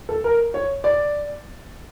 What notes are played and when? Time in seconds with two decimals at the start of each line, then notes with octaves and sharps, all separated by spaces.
0.09 A4
0.24 A#4
0.54 C#5
0.84 D5